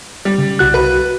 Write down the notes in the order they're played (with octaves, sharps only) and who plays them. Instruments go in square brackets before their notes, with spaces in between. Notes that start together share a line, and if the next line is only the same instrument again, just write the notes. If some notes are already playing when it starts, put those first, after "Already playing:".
[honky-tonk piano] G3
[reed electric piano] C#3
C2 F#4 F#6
[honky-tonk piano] B4